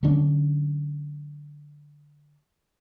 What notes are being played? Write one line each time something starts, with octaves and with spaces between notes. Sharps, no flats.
D3 F#3 C#4 D4